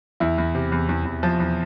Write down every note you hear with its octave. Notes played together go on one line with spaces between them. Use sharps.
E2 E4
E2
C3
E2
E2
E2
F3
E2